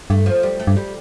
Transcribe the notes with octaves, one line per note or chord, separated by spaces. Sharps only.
G2 A3
F3
G3
A3
G2
G3